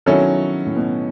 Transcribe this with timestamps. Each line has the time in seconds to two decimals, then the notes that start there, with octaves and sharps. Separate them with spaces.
0.06 B2 D#3 F#3 C#4 E4 A4
0.66 A2
0.76 B2